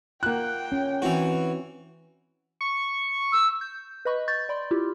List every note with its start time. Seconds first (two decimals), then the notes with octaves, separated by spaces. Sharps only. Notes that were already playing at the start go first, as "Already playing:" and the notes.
0.23 A#3 F4 F#5 G5 F#6
0.72 C#4
1.02 E3 C4 E4 F#4 C5
2.61 C#6
3.32 E6
3.61 G6
4.05 B4 D#5 B5 C#6
4.28 C#6 G6 A6
4.49 D5 B5 C6
4.71 E4 F4 G4